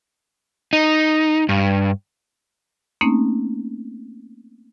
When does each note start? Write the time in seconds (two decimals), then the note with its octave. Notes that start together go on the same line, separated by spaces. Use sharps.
0.73 D#4
1.49 G2
3.01 A3 A#3 C4 C#4 D#4